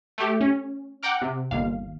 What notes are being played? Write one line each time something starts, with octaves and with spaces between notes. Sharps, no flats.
A3 G4
C#4
F#5 G5 A#5 D6 F6
C3
G1 D#2 F5